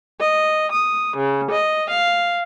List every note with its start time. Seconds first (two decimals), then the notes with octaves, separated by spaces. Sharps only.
0.19 D#5
0.72 D#6
1.17 C#3
1.52 D#5
1.90 F5